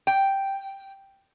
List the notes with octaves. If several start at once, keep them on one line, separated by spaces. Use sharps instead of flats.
G5